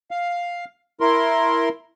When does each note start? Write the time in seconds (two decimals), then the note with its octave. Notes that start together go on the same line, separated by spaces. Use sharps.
0.11 F5
1.01 E4 A#4 C6